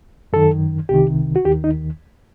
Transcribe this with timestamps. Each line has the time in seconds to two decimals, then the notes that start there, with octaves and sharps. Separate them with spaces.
0.33 F#2 D#3 A4
0.89 C2 C3 D#3 G4
1.36 F#4
1.44 D#2 D#3 G4
1.64 D#4